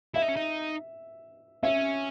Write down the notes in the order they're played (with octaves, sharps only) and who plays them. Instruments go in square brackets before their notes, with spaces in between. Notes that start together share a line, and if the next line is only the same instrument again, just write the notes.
[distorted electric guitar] E4 [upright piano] E5
[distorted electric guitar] D#4
C#4
D#4
[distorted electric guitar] C#4 [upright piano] E5